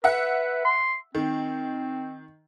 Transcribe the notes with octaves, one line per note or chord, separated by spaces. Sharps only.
B4 E5 F#5
C6
D#3 C4